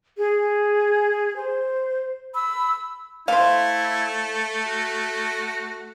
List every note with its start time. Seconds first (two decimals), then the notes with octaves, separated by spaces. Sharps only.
0.17 G#4
1.36 C5
2.33 B5 E6
3.28 A3 E4 C5 F5
4.67 F#4